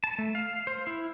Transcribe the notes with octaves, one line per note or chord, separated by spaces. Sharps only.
A5
A3
F5
C5
E4